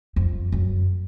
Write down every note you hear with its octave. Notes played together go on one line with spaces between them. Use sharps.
F2
F#2